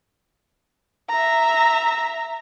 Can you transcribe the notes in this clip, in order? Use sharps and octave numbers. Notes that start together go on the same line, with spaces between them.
E5 A#5